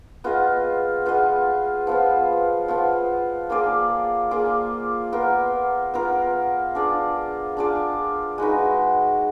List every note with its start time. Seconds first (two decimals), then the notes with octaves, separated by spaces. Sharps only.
0.24 B3 F4 G#4 D#5
1.06 B3 F4 G#4 D#5
1.87 F3 B3 F4
2.68 F3 B3 F4
3.50 A#3 F4 G#4 D5
4.31 A#3 F4 G#4 D5
5.12 B3 F4 A#4
5.94 B3 F4 A#4
6.75 D4 F4 G#4 D5
7.57 D4 F4 G#4 D5
8.38 G#3 D#4 F#4 B4